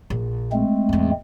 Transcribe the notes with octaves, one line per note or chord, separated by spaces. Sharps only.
A#1
G#3 A3 C4
E2 A2